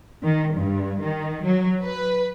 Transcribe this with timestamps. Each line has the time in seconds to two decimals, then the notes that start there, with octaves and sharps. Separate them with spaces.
0.23 D#3
0.56 G2
1.01 D#3
1.43 F#3
1.83 B4